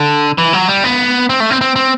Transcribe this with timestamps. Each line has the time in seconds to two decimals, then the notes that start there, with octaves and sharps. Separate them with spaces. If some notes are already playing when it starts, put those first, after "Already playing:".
Already playing: D3
0.38 E3
0.53 F#3
0.68 G3
0.84 B3
1.29 C4
1.40 A3
1.50 C4
1.61 C4
1.76 C4